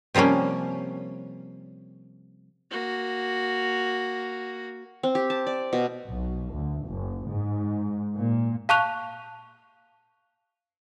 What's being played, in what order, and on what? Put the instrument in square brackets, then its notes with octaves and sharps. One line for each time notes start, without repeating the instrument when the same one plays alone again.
[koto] C3 F3 G3 A#3 C#4
[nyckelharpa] A#3 F#4
[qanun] C4
G4
A5
D5
B2
[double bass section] B1
D2
F#1
G#2
A#2
[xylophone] F5 A5 C#6 F#6 F7